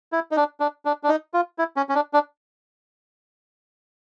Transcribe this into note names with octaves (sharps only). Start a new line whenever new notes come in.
E4
D#4
D4
D4
D4
D4
D#4
F4
E4
C#4
C#4
D4
D4